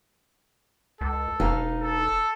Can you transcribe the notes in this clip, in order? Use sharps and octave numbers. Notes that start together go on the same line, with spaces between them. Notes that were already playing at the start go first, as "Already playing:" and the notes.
C#2 A4
E1 D#4 B4 F5
A4